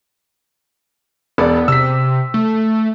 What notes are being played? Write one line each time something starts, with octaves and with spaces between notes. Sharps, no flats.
E1 B3 D5
C3 E6 B6
A3